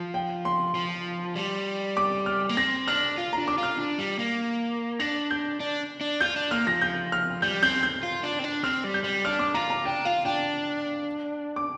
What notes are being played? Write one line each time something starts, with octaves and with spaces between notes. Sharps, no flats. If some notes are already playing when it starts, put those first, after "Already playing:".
Already playing: F3
G5
C6
F3
G3
D6
F6
A#3
C4 A#6
D4 F6
F4
D4 A#5
D6
F4
F6
D4
G3
A#3
D4 A#6
G6
D4
D4
F4 G6
D4
A#3 F6
F3 A#6
G6
F6
G3 G6
C4 G6
G6
F4
D4
C4
D4
C4 F6
G3
G6
G3
D4 F6
D6
F4 A#5
A#5
D4 G5
F4 F5
D4 G5
D6